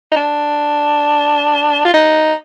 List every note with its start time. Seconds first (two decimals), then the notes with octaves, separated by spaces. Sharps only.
0.11 D#4
0.16 D4
1.85 F4
1.94 D#4